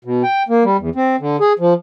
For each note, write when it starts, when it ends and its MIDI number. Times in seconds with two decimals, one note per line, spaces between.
0.05 0.23 47
0.23 0.43 79
0.49 0.64 58
0.64 0.77 55
0.78 0.89 40
0.95 1.16 60
1.20 1.37 50
1.40 1.53 68
1.59 1.74 53